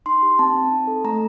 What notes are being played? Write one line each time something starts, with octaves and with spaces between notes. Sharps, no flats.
D#4 C6
G4
C4 A5
C4
D#4
A4
A3 A#5